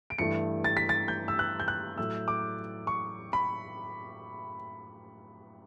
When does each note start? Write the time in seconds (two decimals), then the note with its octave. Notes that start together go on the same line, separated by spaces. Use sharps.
0.10 D7
0.18 G2 E3 A3 C#7
0.64 A6
0.77 B6
0.89 A6
1.08 G6
1.28 E6
1.39 F#6
1.60 G6
1.68 F#6
1.98 A2 F#3 A3 E6
2.28 D6
2.87 C#6
3.33 B5